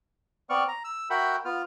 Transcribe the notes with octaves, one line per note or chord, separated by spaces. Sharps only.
B3 C4 D5 C#6 F6
A#5
E6
F#4 A#4 E5 F#5 G5 B5
B3 F4 F6